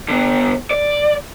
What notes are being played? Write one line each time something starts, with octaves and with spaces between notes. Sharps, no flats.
D3 B3
D5